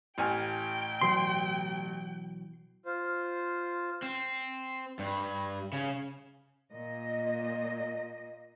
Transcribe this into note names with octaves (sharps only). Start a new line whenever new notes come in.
A1 G5 G#5 F6
B2 E3 F#3 C6
F4 C5
C4
G2
C#3
A#2 D#5